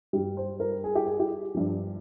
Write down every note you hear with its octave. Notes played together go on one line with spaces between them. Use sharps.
G2 G3
C5
A#4
G#4
G4
G#4
G4
G2 F3